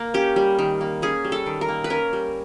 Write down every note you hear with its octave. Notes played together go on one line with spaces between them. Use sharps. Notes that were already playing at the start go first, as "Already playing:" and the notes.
Already playing: A#3
C#4 G4
G3
D#3
A#3
C#4 G#4
G3
A4
D#3
A#4
A#3
B4
C#4 A#4
G3